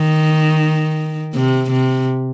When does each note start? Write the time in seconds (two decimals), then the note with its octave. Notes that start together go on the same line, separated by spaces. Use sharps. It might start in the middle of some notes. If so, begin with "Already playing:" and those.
Already playing: D#3
1.34 C3
1.71 C3